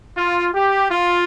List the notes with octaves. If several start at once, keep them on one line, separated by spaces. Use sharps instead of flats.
F4
G4
F4